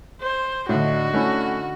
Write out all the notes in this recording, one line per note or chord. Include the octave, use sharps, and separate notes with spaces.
C5
A2 D3 D#4 F#4
A3 C#4 E4